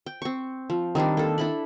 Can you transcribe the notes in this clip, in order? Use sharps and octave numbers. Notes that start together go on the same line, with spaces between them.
G5
C4 C#6
F3
D#3 G3 C4 D4
A#3 A4
D4 E4 B5